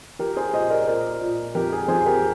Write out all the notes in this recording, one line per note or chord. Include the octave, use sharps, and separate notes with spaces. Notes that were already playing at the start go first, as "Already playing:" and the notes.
F3 G4 A#4
G#4 C5
A#2 C5 D#5
A#4 D5
A#2 A#4 D5
A#2
F2 G4 A#4
G#4
F2 G#4 C5
G4 A#4